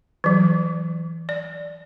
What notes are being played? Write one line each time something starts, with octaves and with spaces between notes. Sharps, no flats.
E3 F#3
D5